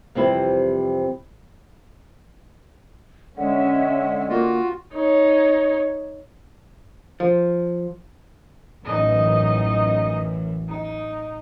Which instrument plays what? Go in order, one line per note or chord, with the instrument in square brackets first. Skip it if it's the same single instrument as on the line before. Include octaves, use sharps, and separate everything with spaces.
[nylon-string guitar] F2 C3 E3 G3 C4 E4
[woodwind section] D3 G#3 [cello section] C#4 E5 [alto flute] F#5
[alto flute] A#3 [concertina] F4 F#4
[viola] D#4 C#5
[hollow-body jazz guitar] F3
[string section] A1 F#2 E3 [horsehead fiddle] D#4 D#5
[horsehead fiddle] D#4